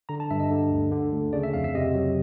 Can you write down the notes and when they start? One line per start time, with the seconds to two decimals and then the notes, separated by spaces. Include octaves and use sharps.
0.09 D3 A#5
0.20 A5
0.31 G2 E5
0.40 D#5
0.51 D3
0.71 D2
0.92 D3
1.12 D2
1.33 C#3 D5
1.43 E5
1.54 F2 F5
1.64 E5
1.75 C3 D#5
1.95 F#3